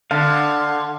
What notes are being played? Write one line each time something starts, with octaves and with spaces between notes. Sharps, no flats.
D3 F5 A5